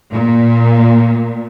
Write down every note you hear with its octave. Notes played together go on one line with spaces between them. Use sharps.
A#2